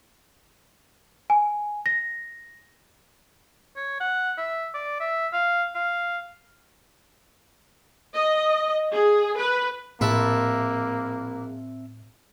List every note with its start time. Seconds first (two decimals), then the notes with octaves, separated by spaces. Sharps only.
1.30 G#5
1.86 A#6
3.76 C#5
4.01 F#5
4.38 E5
4.74 D5
5.00 E5
5.33 F5
5.75 F5
8.13 D#5
8.94 G#4
9.36 B4
10.01 A#1 A2 A#3 C4 E4 B4 E5 A5